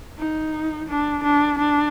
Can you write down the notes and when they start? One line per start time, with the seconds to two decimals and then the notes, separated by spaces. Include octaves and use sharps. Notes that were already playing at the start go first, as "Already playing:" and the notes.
0.19 D#4
0.89 D4
1.24 D4
1.59 D4